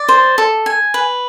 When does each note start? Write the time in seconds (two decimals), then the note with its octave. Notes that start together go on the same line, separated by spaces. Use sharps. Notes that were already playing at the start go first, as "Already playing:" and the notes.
Already playing: D5
0.09 C5
0.38 A4
0.66 G#5
0.94 B4